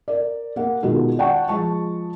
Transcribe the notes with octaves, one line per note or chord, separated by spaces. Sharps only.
A#4 D5
A#3 F#5
B2 D#3 G#3 F4 F#4 A4
D5 F#5 G5 A5 C#6
F3 G#3 A5 C#6